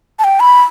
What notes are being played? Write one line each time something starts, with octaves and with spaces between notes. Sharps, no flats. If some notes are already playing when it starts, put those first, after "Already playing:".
A5
G5
B5